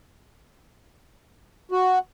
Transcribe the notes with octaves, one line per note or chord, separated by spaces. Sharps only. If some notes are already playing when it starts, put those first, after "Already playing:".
F#4